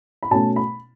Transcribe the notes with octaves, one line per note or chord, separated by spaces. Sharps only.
B5
B2 A3 C#4 A5
B5